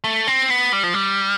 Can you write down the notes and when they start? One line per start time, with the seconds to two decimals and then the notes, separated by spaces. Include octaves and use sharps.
0.04 A3
0.27 C4
0.50 B3
0.73 G3
0.83 F3
0.94 G3